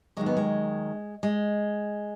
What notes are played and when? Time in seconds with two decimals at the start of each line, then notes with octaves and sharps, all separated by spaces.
0.17 D#2 D#3 F#3 G#3
0.26 B3
0.37 G#3
1.23 G#3